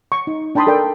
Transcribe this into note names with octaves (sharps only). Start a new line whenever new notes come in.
C#6
D#4
D4 G5 A5 B5 C6 D#6
A4 A#4 D5 G5